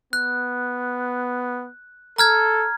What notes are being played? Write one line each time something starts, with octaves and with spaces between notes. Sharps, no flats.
B3 F#6
A4 A#5 F6 G#6